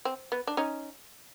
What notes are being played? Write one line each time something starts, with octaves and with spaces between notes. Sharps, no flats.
C4
B3
D4
C#4 D#4